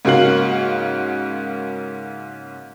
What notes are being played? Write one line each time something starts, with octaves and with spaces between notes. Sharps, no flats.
G#2 C#3 A#3 F#4 F5 F#7